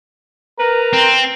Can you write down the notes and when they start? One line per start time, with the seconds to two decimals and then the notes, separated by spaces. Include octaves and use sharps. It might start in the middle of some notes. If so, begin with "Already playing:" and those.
0.59 A#4 B4 A#5
0.93 C4